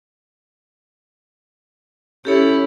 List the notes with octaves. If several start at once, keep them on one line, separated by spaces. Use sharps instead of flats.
C#4 E4 G4 A4 C#5